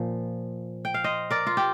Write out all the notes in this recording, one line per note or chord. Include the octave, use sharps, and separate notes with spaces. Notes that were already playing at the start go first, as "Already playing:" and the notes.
Already playing: A#2 F3
G5
F5
C5 D#5
A#4 D5
F4
G4